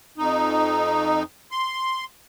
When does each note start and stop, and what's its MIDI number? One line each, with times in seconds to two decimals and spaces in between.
0.18 1.23 41
0.18 1.23 63
1.51 2.04 84